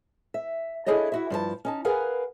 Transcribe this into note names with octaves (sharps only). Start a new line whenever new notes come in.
E5
D4 E4 G#4 A4 C#5 D#5
E4 F#4 E5
G2 F3 G4 A5
C#4 D#4 A5
G#4 A#4 B4 F5 F#5 G#5